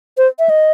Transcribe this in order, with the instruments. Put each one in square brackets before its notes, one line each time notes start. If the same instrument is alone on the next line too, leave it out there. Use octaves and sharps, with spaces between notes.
[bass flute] C5
E5
D#5